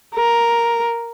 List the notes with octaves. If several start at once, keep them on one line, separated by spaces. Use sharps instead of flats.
A#4